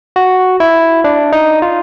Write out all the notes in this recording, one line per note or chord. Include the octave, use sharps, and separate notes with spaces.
F#4
E4
D4
D#4
F4